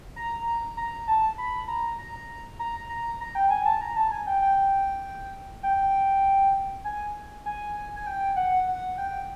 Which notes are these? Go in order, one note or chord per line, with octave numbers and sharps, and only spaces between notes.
A#5
A#5
A5
B5
A#5
A#5
A#5
A#5
A#5
G5
G#5
A5
A#5
A5
G#5
G5
G5
G5
G#5
G#5
G#5
G5
F#5
F#5
G5